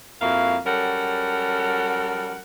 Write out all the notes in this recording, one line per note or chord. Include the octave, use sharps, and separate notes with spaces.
F2 A#3 E4 F#4 F5
F#3 G3 C#4 A4 A#4 F#5